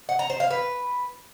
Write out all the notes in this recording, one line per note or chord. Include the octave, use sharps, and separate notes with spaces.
F#5
A#5
C5
F5
B4